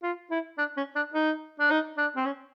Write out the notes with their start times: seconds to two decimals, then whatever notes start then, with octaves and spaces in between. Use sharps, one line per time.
0.03 F4
0.31 E4
0.58 D4
0.77 C#4
0.96 D4
1.14 D#4
1.60 D4
1.71 D#4
1.98 D4
2.16 C4
2.26 C#4